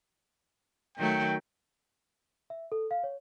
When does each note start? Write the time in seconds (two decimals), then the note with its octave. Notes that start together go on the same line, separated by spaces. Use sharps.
0.97 D#3 F#3 A3 G5
2.50 E5
2.72 A4
2.91 F5
3.04 C#5